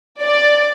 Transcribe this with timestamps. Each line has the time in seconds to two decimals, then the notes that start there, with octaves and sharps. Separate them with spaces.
0.23 D5